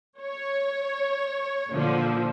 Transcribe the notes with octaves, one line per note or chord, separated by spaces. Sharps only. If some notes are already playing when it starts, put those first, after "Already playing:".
C#5
A#2 D3 F3